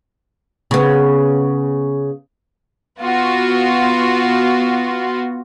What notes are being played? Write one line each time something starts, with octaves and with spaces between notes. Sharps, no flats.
C#3 B3
B3 F4 F#4